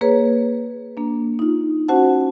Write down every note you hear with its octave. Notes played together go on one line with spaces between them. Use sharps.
A#3 G#4 B4 C#5
A#3 D4
D#4 F4
C#4 F#4 C5 F#5 A5